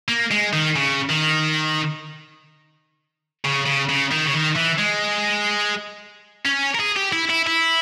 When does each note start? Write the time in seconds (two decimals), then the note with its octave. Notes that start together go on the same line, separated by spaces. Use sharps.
0.08 A#3
0.31 G#3
0.53 D#3
0.76 C#3
1.09 D#3
3.45 C#3
3.66 C#3
3.89 C#3
4.11 D#3
4.26 C#3
4.33 D#3
4.55 E3
4.78 G#3
6.46 C#4
6.75 A#4
6.80 G#4
6.96 G4
7.12 E4
7.30 E4
7.47 E4